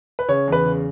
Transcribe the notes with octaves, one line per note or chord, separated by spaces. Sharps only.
B4
C#3 C#5
E2 B4
C#3